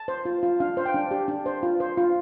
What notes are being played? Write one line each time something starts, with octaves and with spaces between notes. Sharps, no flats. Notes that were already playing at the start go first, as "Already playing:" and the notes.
Already playing: A5
C5
F4
F4
D4 F5
C5 F5
G5
D4
G4
D4
C5
F4
C5
F4